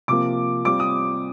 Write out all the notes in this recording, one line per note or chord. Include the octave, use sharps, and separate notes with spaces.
C3 F3 A#3 D6
G3 C4 F4 D6
D#6